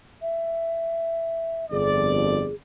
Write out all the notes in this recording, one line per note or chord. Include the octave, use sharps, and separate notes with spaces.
E5
G1 F2 G#4 D5